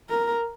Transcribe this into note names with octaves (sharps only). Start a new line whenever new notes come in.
A#4